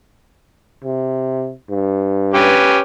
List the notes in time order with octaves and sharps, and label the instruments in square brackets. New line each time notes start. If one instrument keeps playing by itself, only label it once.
[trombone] C3
G2
[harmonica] C#4 G4 B4